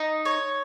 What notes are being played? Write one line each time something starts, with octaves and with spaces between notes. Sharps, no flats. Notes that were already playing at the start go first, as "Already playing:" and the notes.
Already playing: D#4
C#5